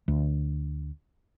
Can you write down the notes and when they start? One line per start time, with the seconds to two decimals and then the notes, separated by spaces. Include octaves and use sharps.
0.08 D2